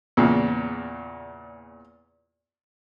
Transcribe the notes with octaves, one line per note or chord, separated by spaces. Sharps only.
E2 A#2 C#3